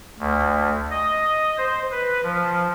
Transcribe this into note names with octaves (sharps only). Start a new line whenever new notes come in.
D2
D#5
C5
B4
F3